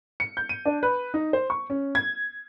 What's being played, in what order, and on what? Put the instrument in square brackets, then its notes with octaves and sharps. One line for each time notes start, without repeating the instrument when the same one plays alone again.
[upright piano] C#7
G6
D#7
D4
B4
D#4
C5
C#6
C#4
G#6